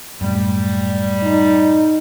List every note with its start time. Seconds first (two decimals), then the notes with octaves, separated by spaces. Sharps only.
0.21 F#2 A2 G3
1.23 D#4